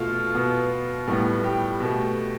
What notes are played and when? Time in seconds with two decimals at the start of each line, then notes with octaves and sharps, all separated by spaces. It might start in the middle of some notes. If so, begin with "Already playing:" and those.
Already playing: B2 A3 F4
0.35 B2 B3
1.07 A2 G3 B3
1.44 G4
1.80 B2 A3